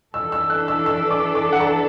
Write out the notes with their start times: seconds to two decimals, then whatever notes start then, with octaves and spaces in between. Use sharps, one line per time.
0.14 E3 D4 A4 E6
0.32 E6
0.50 F#6
0.68 E6
0.86 E6
1.11 D6
1.35 D6
1.52 F#5
1.60 A5